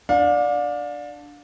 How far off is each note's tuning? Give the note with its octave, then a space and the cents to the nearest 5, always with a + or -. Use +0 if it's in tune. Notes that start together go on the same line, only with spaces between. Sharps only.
D4 +0 F5 +35